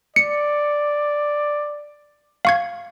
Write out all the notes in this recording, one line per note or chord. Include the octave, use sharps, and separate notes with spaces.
D5 C#7
F5 C#6 G#6